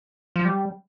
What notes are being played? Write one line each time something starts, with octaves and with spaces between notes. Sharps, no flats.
F3
G3